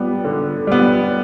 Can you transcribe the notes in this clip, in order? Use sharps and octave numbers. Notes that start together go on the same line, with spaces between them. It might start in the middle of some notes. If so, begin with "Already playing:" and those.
Already playing: G3 B3
D3
G3 B3